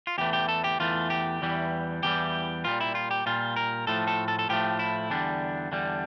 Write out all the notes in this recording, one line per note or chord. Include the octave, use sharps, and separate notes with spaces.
F4
E2 E3 A3 G4
G4
A4
G4
E2 E3 A3 F4
G4
E2 E3 G3
E2 E3 G3 G4
A#2 G3 F4
E4
F4
G4
A#2 G3 F4
A#4
A2 F3 A3 A4
A4
A4
A4
A2 F3 A3 G4
E4
E2 D3 G3 D4
E2 D3 G3